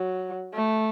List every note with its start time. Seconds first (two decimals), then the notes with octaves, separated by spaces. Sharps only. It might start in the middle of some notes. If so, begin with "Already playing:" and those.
Already playing: F#3
0.54 A3